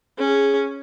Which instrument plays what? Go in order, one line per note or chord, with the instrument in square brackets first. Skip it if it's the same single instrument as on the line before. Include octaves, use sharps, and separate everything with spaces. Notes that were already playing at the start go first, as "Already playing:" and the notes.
[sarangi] C#4 [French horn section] G#4